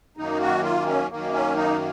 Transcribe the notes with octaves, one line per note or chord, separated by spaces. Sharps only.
F#2 D#3 A#3 D#4
F#4
F4
C#4
F#2 D#3 A#3
C#4
D#4